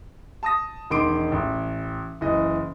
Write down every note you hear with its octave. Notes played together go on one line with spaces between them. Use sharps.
A5 D#6 A#6
E1 D#3 C6 D6 D7
A1
F#1 E3 D#5